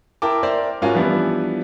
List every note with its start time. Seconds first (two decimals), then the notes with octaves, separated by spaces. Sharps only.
0.22 E4 A#4 G5 A5 D6
0.43 A#4 C5 D5 E5 G5
0.82 G#2 C#4 F4 F#4 A#4 G#5
0.95 E3 F3 G3 B3 D4 E4